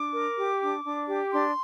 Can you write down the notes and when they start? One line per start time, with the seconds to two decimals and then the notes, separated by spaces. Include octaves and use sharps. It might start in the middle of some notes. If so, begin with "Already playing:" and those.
Already playing: D4 D6
0.13 A#4
0.37 G4
0.61 D4
0.85 D4
1.08 G4
1.31 D4 C6